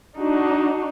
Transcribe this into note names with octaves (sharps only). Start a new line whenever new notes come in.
D4 D#4 F#4